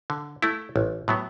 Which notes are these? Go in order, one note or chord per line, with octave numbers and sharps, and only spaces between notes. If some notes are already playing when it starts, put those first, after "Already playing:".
D3
A3 E4
A1
A2 F#3 B3